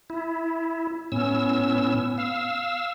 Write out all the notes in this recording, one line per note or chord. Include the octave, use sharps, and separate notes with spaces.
E4
A2 B3 C#4 E6
F5 E6